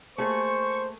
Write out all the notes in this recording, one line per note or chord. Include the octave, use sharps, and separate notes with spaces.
A3 A#3 G#4 C5 C#6